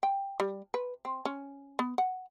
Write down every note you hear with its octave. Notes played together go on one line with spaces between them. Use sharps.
G5
G3
B4
C4
C#4
B3
F#5